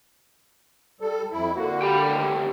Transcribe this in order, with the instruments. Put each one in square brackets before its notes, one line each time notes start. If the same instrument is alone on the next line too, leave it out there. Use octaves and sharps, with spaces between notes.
[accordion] G3 A4
F2 E4
[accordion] D3 A#3 [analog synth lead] F#4
[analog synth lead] G4 [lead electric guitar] G5 B5
[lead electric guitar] A2 D#3